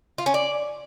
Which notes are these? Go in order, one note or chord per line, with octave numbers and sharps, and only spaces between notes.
F4
C#4
D5